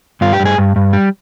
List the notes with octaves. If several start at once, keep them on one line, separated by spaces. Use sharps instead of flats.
G2 F4
G4
G2
G#4
G2
G2
G3